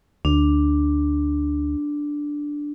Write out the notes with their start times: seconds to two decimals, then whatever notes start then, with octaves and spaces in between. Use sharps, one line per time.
0.25 D2 D4